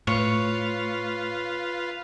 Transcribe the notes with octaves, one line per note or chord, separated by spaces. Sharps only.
A2 F4 B4 C#5 F5